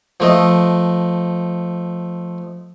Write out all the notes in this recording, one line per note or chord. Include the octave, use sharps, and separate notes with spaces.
F3 A3 D#5